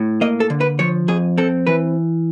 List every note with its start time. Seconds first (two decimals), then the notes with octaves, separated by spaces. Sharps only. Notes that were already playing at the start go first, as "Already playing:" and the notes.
Already playing: A2
0.21 A#3 D#5
0.40 A4
0.50 D3
0.61 B4
0.79 F3 C#5
1.08 F2 G#4
1.38 C4 A4
1.67 E3 B4